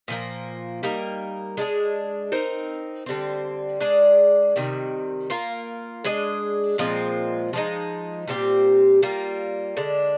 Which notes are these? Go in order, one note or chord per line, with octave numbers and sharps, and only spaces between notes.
A#2 F3 A#3
G3 A#3 D#4 A#4
G#3 D4 G#4
C4 D#4 A#4
D3 G3 C4
G#3 D4 G#4 D5
C3 D#3 G3
A#3 F4 A#4
G#3 D4 G#4 D#5
A#2 F3 G#3 C4
F3 G#3 D#4
A#2 G3 C4 G4
G3 A#3 F4
D3 G#3 D4